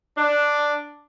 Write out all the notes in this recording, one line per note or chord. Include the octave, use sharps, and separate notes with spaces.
D4